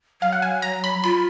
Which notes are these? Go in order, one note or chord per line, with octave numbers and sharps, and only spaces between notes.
F#3 F5
F#5
G#5
A#5
B5
F4 B5